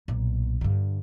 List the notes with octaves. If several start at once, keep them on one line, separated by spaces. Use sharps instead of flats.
B1 A#2
G2 D3